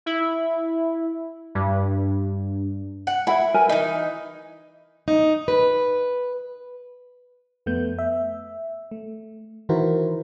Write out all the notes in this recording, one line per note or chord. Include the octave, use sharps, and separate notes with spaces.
E4
G2
F#5
E4 E5 F#5 B5
A#4 B4 G#5
E3 D#4 E5
D#4
B4
F2 A3 B3 G6
E5
A3
D#3 E3 E4 F#4 A#4 C5